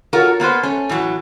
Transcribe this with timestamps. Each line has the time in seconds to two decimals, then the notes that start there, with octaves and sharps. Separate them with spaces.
0.13 F4 F#4 A4 A#4 C#5
0.40 A#3 B3 B4 C5
0.63 A3 C#4
0.89 A2 E3 F#3